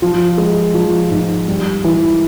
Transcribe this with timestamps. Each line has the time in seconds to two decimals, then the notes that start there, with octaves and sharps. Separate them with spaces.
0.02 F3
0.38 G#3
0.74 F3
1.11 G#2
1.48 G3
1.84 E3